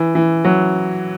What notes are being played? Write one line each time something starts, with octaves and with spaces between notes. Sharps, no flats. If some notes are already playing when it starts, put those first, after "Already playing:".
Already playing: E3
E3
F#3